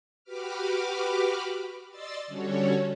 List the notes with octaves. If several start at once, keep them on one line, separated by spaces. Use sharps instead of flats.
F#4 G4 B4 B5 D6 F6
D5 D#5 C6 E6 A6
D3 G3 C#4 F#4 A4 C#5